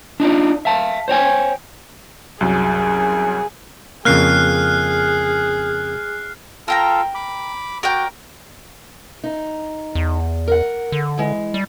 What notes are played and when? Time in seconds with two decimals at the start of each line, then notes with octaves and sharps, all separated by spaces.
0.20 D4 D#4 F4 D5
0.65 E5 F5 A5
1.08 C5 C#5 G5 G#5
2.41 C2 F#2 F#3 G#4
4.05 F2 C#3 A#3 G#4 F6 F#6 C7
6.68 F4 A4 A#4 G5 A#5
7.15 B5 D6
7.83 F#4 A#4 D5 G5
9.24 D#4
9.95 E2
10.48 A#4 F#5
10.92 D3
11.18 E3 G#3
11.54 G3